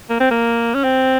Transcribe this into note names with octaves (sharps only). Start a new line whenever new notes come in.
A#3
C4
A#3
C#4
C4